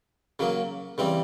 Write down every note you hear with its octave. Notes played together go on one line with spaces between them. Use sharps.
C#3 F#3 A#3
C#3 E3 G3 C4